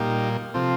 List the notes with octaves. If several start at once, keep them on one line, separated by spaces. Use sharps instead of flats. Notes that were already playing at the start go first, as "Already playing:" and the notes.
Already playing: A#2 G3 A#3 D#4 G4
C3 F3 C4 F4 A4